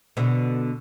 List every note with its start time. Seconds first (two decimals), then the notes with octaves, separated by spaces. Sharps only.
0.17 B2 D3